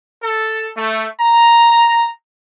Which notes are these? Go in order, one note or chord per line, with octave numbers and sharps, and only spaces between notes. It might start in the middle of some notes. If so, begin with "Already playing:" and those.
A4
A3
A#5